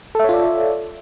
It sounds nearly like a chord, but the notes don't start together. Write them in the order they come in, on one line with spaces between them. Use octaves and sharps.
A4 E5 C#5 F4 D5